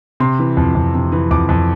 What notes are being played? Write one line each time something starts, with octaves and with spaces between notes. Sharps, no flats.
C3 C6
E3
F2
F2
C3
E3
F2 D6
F2